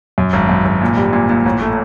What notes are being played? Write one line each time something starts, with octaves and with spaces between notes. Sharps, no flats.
F#2
G#1
F#2
G#1
A#2
G3
A#2
A#2
A1
A3